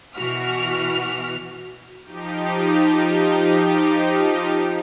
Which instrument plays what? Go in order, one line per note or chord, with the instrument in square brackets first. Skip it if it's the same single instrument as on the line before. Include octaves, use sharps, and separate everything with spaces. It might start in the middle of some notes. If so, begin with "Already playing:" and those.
[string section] B2 E3 F#4 F6 B6
[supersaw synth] F3 D#4 G4